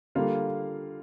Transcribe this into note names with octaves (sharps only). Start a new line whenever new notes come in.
D3 G3 A#3 F4